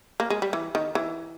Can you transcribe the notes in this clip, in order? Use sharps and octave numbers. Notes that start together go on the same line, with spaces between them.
A#3
G#3
G3
E3
D#3
E3